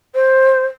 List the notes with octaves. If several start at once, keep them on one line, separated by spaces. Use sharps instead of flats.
C5